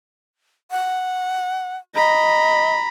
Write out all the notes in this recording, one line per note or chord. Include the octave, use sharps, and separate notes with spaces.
F#5
D#5 A#5 B5